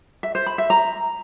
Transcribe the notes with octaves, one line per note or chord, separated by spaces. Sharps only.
E5
C5
B5
E5
A#5